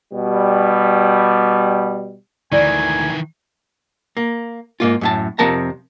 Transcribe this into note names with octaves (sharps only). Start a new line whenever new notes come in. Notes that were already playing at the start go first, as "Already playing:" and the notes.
B2 G3
D2 D#3 E3 E4 D5 G#5
A#3
G#2 A#3 F4
F#2 A2 A5
F2 C3 F3 A#4 A5 A#5